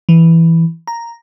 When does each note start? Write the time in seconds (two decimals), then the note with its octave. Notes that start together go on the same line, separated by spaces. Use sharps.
0.09 E3
0.87 A#5